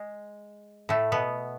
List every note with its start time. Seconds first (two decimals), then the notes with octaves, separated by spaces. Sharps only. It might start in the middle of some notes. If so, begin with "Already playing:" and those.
Already playing: G#3
0.89 A2 A3
1.12 B2 B3